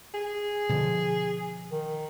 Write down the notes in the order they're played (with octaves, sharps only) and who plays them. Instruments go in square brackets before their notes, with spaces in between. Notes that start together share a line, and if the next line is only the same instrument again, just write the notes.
[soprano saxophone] G#4
[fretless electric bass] B2 D3 F3
[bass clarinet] D#3